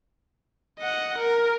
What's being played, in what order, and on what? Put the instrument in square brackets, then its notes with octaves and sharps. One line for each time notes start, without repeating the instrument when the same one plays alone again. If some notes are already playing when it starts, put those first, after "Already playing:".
[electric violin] D#5 F#5
A#4